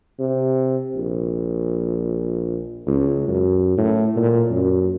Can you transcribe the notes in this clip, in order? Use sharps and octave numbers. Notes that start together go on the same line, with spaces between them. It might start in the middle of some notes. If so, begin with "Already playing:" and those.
C3
A#1
C#2
F#2
A2
A#2
F#2